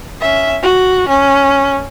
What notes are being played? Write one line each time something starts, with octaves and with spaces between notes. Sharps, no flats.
C#4 E5
F#4
C#4